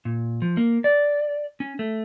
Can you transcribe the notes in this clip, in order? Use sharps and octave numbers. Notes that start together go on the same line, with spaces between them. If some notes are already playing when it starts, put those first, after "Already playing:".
A#2
F3
A#3
D5
C#4
A3